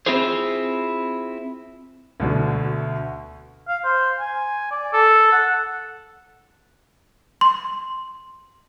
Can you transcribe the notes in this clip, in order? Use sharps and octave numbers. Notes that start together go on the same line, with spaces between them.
C4 E4 F4 G#4 C5
D2 B2 D3
F5
C5
G#5
D5
A4
F#5
C6